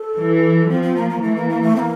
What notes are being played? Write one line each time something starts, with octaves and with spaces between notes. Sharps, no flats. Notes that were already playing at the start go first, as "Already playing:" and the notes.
Already playing: A4
E3
F3 C4
C4
A#3
A#3
E3 A3
A#3
A#3
A3
C4
A#3